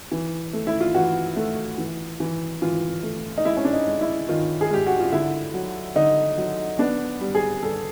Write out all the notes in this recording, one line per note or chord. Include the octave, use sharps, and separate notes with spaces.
E3
A3
E4
F4
E3 F#4
A3
E3
E3
E3 F4
A3
D#4
G#3 E4
C#4
D4
D#4
G#3
E4
D#3 F4
G#4
G#3 G4
F#4
F4
D3 E4
F#3
D3 D#4
F#3
B3 D4
G3
G#4
G3 A4